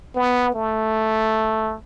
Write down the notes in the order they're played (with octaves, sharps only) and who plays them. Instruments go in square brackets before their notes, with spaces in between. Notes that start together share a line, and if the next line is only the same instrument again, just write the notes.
[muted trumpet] B3
A3